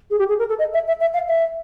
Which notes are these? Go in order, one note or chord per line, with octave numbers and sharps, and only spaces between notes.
G#4
G4
G#4
A#4
A4
D#5
E5
E5
E5
F5
E5